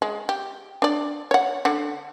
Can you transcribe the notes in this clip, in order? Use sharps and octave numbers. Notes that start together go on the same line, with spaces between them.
G#3
G4
D4 D5
C#5 F#5
D3 F#5